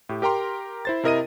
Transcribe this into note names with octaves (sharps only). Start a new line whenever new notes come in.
A2 G4
G4 A#4 G5 A#5 C6
E4 C5 A6
C3 E4 A#4 D#5 A#6 D#7